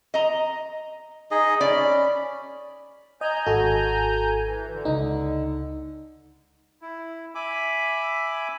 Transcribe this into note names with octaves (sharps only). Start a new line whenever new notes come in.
D#5 A#5
D#4 G#4 D#5
C#4 D5 B5
D#5 G#5 A#5 G6
G#1 F#4 A4
E3
D3
C#2 D#4
E4
E5 G#5 B5 D6